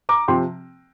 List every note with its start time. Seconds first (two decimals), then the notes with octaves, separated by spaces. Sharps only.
0.09 A#5 D6
0.28 C3 F3 C4 G5 C6